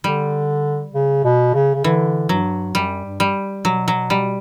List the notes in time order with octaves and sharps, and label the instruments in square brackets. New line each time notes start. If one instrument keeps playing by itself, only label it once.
[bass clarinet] D3 [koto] G3
[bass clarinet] C#3
B2
C#3
C#3
[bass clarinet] D3 [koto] E3
[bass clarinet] G2 [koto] F#3
[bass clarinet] F#2 [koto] G3
[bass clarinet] G2
[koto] G3
[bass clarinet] B2 [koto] F#3
[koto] F#3
G3